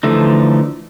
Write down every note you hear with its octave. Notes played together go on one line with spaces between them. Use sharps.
D3 E3 F3 A3 D#4